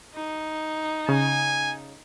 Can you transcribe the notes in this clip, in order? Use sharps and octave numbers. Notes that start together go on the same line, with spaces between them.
D#4
C#3 G#5